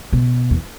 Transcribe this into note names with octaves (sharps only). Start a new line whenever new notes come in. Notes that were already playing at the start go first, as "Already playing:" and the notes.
B2
E2